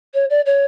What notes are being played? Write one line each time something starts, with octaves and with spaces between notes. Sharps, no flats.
C#5
D5
C#5